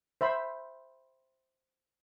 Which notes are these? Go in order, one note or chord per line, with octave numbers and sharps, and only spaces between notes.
C5 E5 B5